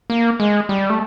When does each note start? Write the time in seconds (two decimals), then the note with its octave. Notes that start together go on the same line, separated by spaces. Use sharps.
0.10 A#3
0.40 G#3
0.69 G3
0.90 A3